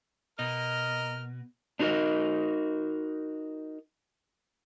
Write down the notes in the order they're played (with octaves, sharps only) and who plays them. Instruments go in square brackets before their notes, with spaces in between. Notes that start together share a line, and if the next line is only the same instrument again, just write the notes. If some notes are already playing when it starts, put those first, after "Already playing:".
[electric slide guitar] B2 [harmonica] A#4 F6 [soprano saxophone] D#5
[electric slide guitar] D4 D#4 F#4 G#4 A#4 D#5